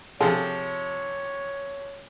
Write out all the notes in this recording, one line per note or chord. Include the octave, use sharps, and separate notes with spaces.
C3 F3 F4 G#4 A4 C#5